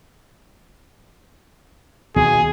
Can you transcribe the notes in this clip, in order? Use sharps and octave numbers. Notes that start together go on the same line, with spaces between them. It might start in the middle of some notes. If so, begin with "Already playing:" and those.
D#1 D#2 B2 G#4